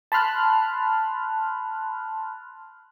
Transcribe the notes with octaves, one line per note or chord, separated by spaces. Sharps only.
A5 B5 C6 F6 F#6